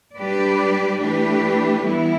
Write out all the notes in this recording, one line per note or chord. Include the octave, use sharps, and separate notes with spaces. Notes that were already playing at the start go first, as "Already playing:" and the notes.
G3 D4 G4 B4 D5
E3 A3 D4 G4 B4
E3 G3 B3 E4